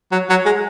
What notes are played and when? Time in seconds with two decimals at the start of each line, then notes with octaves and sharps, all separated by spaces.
0.12 F#3
0.30 F#3
0.46 G#3